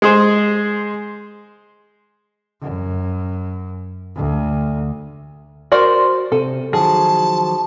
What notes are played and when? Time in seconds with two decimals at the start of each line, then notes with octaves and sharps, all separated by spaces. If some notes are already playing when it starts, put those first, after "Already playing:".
0.02 G#3 G#4 C5
2.61 F#2
4.16 D2
5.72 F#4 A#4 C5 D5
6.32 C3 A4
6.73 D#3 F3 F#3 G#4 A5